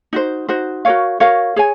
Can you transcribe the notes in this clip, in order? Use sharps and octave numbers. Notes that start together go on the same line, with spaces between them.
D#4 F#4 C5
D#4 F#4 C5
F#4 A#4 C#5 F5
F#4 A#4 C#5 F5
G#4 C#5 G#5